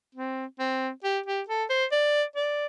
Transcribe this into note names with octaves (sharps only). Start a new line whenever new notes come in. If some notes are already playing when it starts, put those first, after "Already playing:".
C4
C4
G4
G4
A4
C5
D5
D5